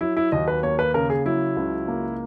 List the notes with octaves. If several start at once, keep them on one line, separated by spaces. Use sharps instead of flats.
F#3 E4
E4
D#2 D#5
B4
A#3 C#5
B4
C#3 A#4
G#4
F#3 E4
C#2
A#3